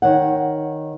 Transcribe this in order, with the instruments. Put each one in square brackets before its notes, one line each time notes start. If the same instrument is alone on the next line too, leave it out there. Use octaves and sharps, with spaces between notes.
[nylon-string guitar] D#3 C#5 F#5